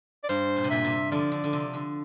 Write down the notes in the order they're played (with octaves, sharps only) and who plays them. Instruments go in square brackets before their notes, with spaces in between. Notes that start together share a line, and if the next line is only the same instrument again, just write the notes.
[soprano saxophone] D5
[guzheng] G2 [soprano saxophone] C5
[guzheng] A#2
C3
[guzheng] A#2 [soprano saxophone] E5
[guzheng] C3
[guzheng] D3 F3 [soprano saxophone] D5
[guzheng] D3
D3
C3
D3